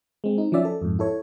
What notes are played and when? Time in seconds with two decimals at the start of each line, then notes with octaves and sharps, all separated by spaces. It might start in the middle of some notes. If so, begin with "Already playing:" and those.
0.24 G#3 C4
0.38 D#4
0.52 F3 F#3 C#4 D5 E5
0.65 A4
0.82 F2 G#2
0.99 E4 A4 C#5